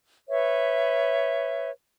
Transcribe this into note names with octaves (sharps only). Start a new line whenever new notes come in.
B4 C#5 E5